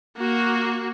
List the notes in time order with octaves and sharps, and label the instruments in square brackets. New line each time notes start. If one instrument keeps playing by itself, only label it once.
[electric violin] A#3 F#4